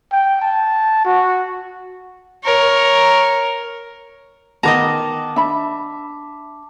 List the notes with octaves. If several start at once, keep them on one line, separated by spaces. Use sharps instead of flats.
G5
A5
F#4
A#4 C#5
D#3 B3 D#5 A5 A#5 D6
D4 E5 B5